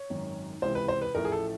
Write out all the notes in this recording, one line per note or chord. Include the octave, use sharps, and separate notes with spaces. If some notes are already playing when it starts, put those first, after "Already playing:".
Already playing: C#5
G#1 F#2 D#3
C#2 C3 E3 C5
B4
C5
B4
A1 A2 F3 A3 A#4
G#4
A4